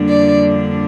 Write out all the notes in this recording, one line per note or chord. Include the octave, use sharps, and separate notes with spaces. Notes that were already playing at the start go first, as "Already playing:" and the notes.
Already playing: F2 D3 G3 A#3 D4
D5